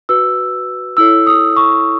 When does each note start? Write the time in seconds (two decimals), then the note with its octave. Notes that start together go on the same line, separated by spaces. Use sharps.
0.09 F#4 B4 E6
0.97 E4 A4 C#5 E6
1.27 D#6
1.56 C#6